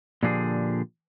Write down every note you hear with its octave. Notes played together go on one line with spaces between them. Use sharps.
A#2 D3 F3 D4 G4 G#4